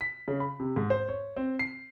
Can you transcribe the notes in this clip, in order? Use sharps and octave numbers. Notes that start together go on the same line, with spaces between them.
B6
C#3
B5
C3
G#2
C5
C#5
C4
C7